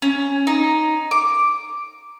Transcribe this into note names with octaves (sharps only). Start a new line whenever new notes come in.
C#4
D#4
D6